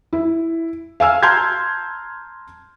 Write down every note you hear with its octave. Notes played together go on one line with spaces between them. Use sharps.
E4
F5 G#5 E6 F6
A5 A#5 C6 F6 G6 G#6